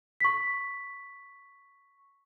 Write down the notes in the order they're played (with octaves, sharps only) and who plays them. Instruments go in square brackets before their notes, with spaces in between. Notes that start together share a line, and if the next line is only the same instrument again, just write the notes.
[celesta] C#6 B6